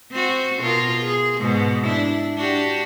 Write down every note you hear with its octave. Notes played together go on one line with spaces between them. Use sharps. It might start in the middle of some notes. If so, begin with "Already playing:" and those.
C4 F#4
B2 F4 A#4
G#4
G#2 B2
D4 E4
D4 F#4 G4